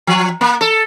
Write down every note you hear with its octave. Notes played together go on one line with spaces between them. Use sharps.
F3
A#3
A4